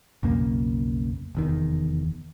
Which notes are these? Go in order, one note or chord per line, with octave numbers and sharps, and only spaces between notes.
B1 F2 C#3 A#3
F1 E2 D#3